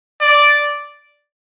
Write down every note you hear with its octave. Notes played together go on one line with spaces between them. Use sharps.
D5